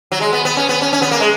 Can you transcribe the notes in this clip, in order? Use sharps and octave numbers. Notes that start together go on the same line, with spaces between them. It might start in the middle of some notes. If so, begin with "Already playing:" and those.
F#3
G#3
B3
B3
C#4
B3
C#4
C#4
B3
A#3
G#3